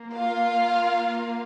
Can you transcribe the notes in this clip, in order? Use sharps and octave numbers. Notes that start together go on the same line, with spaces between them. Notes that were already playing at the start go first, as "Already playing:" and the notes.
Already playing: A#3
F4 F5